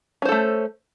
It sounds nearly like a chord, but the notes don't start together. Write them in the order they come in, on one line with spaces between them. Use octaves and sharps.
C#4 C5 A4 A3